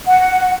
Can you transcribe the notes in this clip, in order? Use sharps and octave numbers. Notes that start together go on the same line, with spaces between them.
F#5